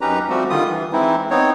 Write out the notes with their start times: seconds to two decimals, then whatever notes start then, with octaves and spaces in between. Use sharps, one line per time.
0.01 F#2 C#4 D#4 G4 B4 A#5
0.29 F3 G3 A3 C4 F#4 G4
0.50 D3 D#3 G3 F4 D#6
0.69 E3
0.93 E3 G#3 C4 D#4 E4
1.30 B3 C4 D#4 C#5